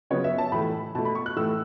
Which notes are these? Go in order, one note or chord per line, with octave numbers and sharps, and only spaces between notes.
C#3 F#3 B3 C#5
E5
A5
A2 E3 A3 B5
B2 A3 A5
B5
C#6
F#6
A2 E3 A3 E6